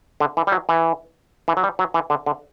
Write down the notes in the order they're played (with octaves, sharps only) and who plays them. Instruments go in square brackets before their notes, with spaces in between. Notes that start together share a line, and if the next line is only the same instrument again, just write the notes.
[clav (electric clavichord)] D3
E3
G3
F#3
E3
E3
F#3
G3
F#3
E3
D3
D3